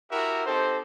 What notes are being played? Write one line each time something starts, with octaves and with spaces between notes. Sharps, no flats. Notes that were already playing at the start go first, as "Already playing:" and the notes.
E4 F#4 G4 A#4 E5
C4 D#4 G4 A4 C5